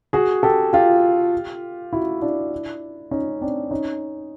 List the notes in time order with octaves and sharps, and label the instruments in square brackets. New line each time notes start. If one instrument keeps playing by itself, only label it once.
[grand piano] F#4 G#4
G4 A4
F4 G4
E4 F#4
D4 E4
C#4 D#4
C4 D4
C#4 D#4